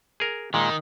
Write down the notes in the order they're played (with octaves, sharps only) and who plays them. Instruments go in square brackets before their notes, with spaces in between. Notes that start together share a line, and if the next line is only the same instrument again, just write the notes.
[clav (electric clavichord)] G#4 A#4
[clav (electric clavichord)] A#2 G#3 [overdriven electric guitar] D#3